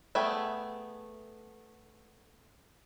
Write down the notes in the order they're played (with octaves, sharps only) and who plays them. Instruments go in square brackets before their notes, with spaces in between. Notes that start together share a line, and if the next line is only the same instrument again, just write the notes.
[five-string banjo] A3 B3 G#4 G5